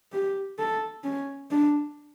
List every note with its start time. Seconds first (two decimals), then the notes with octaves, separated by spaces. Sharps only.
0.13 G4
0.59 A4
1.04 C#4
1.51 D4